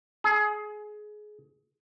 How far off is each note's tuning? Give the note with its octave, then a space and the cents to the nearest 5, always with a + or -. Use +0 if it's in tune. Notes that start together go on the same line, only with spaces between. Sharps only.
G#4 +20